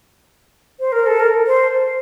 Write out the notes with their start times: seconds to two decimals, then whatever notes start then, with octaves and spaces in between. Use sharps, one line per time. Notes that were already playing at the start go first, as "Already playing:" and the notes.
0.80 C5
0.92 A#4
1.06 A4
1.20 A#4
1.47 C5